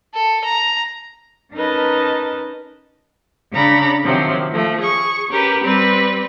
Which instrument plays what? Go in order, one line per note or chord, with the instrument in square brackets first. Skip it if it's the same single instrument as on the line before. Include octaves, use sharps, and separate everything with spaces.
[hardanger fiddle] A4
A#5
[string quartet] C#4 D#4 A#4 B4 D#5 A5
C#3 C#4 D4 A#5 B5 A6
C3 D#3 F3 F#3 C4
F3 A3
G#4 C#6
C#4 G4 A#4 B4
G3 C4 B4